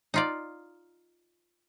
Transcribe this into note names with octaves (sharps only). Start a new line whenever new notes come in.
D#4 F4 D5